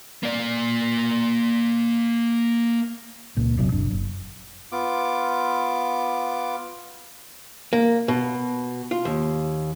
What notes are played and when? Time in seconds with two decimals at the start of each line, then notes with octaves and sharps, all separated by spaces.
0.23 A#3 D5
3.37 C#2 A#2
3.56 E1 A#1 C3 F#3
3.72 F#1 D4
3.91 F#1
4.72 B3 F4 D6
7.73 A#3
8.08 B2
8.91 F4
9.05 D#2